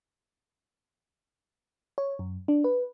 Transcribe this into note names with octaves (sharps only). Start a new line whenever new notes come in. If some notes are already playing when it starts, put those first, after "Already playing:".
C#5
F#2
D4
B4